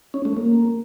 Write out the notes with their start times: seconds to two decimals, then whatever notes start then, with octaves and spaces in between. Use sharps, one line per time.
0.14 C#4
0.25 A3
0.37 A#3